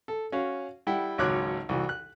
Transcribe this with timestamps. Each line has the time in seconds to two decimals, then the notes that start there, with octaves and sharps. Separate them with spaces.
0.08 A4
0.32 C#4 F#4 F5
0.87 G3 E4 F#5 G5
1.18 G#1 C#2 F#3 C#5 D6 F#6
1.69 C2 E3 F#4
1.89 F#6